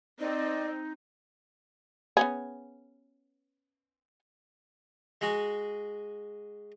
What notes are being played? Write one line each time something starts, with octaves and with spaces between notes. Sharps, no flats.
C4 D#4 D5 D#5
B3 C#4 G#4
G#3 F#4 G#4